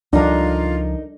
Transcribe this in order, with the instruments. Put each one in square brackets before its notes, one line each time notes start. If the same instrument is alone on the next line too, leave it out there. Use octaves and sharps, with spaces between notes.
[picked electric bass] C#2 F3 [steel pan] D4 [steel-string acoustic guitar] D#4 A#4 [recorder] F4